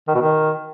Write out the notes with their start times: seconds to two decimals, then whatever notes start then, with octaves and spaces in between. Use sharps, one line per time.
0.08 D#3
0.15 B2
0.21 D#3